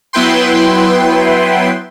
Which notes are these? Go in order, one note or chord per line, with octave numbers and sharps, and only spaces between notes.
F#3 B3 E4 B4 G5 C6